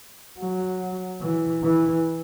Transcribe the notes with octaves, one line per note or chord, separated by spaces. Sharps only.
F#3
E3
E3